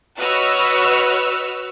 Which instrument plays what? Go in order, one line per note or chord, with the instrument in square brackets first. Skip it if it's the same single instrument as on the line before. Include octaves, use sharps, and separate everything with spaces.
[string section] F#4 B4 C#5 D#5 E6 F6